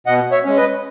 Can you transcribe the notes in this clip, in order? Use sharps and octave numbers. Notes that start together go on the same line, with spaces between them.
B2 D#5 F#5
C#5 E5
G#3 C#4
B4 D#5